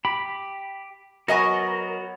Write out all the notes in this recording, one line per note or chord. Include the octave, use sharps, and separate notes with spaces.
G4 B5
F#3 B3 F#4 A#4 C#5 D#5 G#5